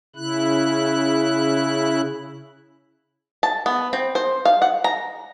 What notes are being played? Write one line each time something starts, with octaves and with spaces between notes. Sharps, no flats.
C#3 E4 F#6
A5
B3
C4
C5
F5
F#5
A#5